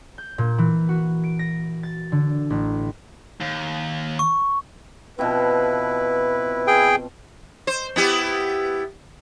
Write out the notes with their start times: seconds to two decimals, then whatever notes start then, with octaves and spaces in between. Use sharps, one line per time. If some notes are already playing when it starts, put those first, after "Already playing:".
0.18 G6
0.38 A#2
0.58 E3
0.89 F#4
1.24 D7
1.39 A#6
1.83 A6
2.12 D3
2.50 A1
3.41 D#2
4.19 C#6
5.19 B2 F3 C4 E4 B4
6.67 G#4 G5
7.67 C5
7.96 B3 E4 G4